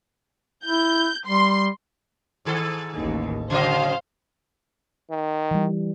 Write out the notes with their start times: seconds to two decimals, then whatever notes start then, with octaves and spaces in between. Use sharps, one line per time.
0.66 E4 G6
1.27 G3 C6
2.45 G#2 D#3 A4
2.96 A1 D#2
3.50 C#3 F#3 C5 D#5 F5
5.11 D#3
5.51 E3 G3